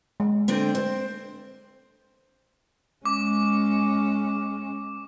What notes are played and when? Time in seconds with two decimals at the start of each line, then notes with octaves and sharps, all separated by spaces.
0.20 G#3
0.48 D3 C4 G5
0.75 C5
3.05 G#3 C#4 D6